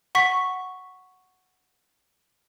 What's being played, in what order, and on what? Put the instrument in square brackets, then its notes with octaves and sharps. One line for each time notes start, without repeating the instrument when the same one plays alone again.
[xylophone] F#5 C#6 B6